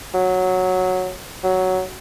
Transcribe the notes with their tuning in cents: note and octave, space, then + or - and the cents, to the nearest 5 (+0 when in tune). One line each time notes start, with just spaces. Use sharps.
F#3 -5
F#3 +5